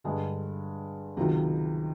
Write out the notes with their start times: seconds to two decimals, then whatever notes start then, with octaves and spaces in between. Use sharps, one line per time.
0.04 G2 D3 G#3
1.17 C#2 C3 D#3 F#3